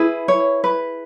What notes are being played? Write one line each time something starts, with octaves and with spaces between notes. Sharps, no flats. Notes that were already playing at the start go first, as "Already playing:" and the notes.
Already playing: E4 G#4 B4
C#5
B4